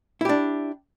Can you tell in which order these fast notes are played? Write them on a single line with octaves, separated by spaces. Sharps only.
E4 G4 D4